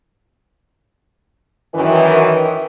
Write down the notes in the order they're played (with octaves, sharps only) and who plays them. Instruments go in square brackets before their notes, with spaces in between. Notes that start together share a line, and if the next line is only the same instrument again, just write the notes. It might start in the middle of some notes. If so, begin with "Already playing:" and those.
[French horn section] F#2 D#3 E3